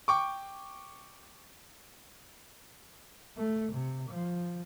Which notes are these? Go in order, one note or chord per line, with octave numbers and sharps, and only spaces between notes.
G5 C#6 D6
A3
C3
F3